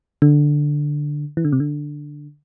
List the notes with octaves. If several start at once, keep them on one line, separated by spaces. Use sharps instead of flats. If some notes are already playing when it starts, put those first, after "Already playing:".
D3
E3
D3
C3
D3